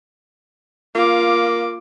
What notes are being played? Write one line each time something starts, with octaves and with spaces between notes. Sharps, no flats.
A#3 F4 D6